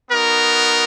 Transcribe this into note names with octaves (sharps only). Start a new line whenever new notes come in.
B3 D#4 F#4 A#4